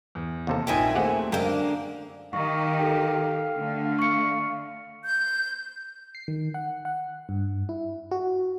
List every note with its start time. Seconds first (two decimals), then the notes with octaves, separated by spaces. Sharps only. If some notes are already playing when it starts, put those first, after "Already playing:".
0.15 E2
0.47 D#2 C3 A4
0.67 A#1 A#2 D#4 E4 G5 G#5
0.95 D#2 A3 C4 G4 G#4 F#5
1.32 F#2 D3 G#3 A#3 A#4 G5
2.33 D#3 G4 F5 C#6
2.79 A4 G5
3.57 D3 A3
3.99 C#6 C#7
5.03 G6
6.15 C7
6.28 D#3
6.54 F#5
6.85 F#5
7.29 G2
7.69 E4
8.11 F#4